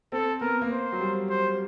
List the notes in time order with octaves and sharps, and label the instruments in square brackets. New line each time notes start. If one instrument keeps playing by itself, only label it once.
[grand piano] C4 [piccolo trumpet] A4
[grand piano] B3 [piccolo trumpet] A#4
[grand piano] A#3
[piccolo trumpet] C5
[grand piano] F#3
G3
[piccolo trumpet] C5